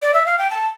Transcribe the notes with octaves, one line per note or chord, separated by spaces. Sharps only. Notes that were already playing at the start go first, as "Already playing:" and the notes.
D5
E5
F5
G5
A5